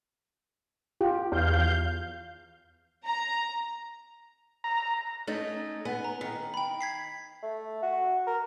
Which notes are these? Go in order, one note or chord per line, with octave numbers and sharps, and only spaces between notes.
F4 G4
E2 F5 G6
A#5
A#5
A3 C#4 D#4
B3 G#5
A#5
D#3
G5 B5
G#6 B6 C7
A3
F#4
A#4